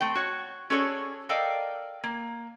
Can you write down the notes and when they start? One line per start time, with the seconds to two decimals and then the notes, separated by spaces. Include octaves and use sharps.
0.01 A3 C4 G5
0.15 F#4 C#5
0.70 C#4 F#4 G#4 A4 C#5 D5
1.29 A4 A#4 D5 D#5 F5 G5
2.04 A#3